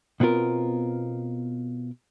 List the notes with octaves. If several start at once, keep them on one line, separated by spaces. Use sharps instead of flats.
B2 B3 C4 F4 A#4